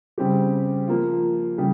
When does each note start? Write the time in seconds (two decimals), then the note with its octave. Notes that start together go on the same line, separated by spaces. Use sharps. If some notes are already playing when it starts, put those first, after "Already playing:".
0.18 C#3 G3 C4 G4
0.88 F3 A#3 F4
1.58 C#3 G3